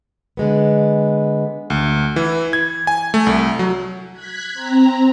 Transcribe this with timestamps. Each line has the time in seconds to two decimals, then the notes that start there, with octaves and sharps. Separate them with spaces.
0.37 D3 G#3 B3
1.70 D2
2.16 E3
2.53 G#6
2.87 G#5
3.14 A3
3.27 C2
3.59 F#3
4.12 F#6 G#6 B6
4.53 C4 A#5